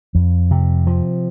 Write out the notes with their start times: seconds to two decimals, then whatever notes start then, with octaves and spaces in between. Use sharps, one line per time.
0.15 F2
0.51 C3
0.87 F3